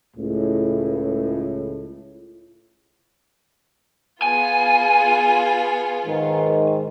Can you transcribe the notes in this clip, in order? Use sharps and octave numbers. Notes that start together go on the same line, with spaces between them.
C#2 A2
B3 F4 G#4 G#5
G#2 D#3